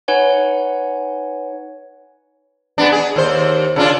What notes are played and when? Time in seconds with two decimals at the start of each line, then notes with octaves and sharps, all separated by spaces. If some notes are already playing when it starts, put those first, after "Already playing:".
0.08 D#4 B4 C#5 F#5 G#5
2.78 G#3 B3 D4
2.92 G#4
3.16 D#2 C5
3.76 C#3 D4 F4